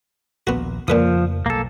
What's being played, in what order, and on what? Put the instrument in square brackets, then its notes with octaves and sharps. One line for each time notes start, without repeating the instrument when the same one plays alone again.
[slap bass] A#1 D#2 [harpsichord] B3 F#4
[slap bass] F2 C#3 A3 [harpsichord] A#2 B4 D#6 [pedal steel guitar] F3
[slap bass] B1 [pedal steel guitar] A#3 A4